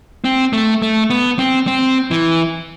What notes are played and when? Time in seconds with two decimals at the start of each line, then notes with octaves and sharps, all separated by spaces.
0.24 C4
0.53 A3
0.82 A3
1.10 B3
1.39 C4
1.67 C4
2.11 E3